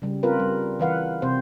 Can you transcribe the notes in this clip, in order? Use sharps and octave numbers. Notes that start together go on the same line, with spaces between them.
C#3 G3
C4 F4 A#4 B4
G3
E3 B4 F5 F#5
C3 C4 C5